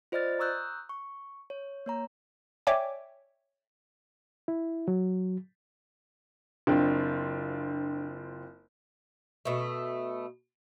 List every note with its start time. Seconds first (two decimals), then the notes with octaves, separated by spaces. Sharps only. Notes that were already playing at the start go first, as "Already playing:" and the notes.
0.12 F4 C5 D5 D#5 F6 A6
0.39 A#5 C#6 D#6 E6 F#6 G6
0.89 C#6
1.50 C#5
1.86 A#3 C#5 A#5
2.67 C#5 D5 E5 G5 G#5 D6
4.48 E4
4.88 F#3
6.67 F#1 C4 D4 F4
9.45 B2 A3